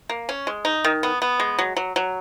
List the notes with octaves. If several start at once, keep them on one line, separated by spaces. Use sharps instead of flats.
A#3
C#4
G#3
D#4
D#3
B3
B3
G#3
F#3
F#3
F#3